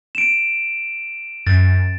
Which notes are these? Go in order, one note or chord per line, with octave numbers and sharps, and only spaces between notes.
D7 E7
F#2 A6